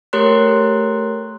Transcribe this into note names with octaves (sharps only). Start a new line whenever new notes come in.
A3 G4 A#4 C#5 C6 F#6